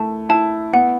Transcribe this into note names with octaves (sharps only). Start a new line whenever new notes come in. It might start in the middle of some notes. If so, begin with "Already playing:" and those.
Already playing: A3 E4 A5
E4 A5
B3 F#5